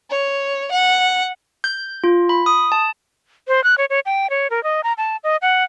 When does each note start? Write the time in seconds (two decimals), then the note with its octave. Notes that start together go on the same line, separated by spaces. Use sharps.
0.10 C#5
0.71 F#5
1.64 G6
2.04 F4
2.29 B5
2.46 D#6
2.72 A5
3.48 C5
3.64 F#6
3.78 C#5
3.90 C#5
4.06 G5
4.30 C#5
4.50 A#4
4.64 D#5
4.84 A#5
4.98 A5
5.24 D#5
5.42 F#5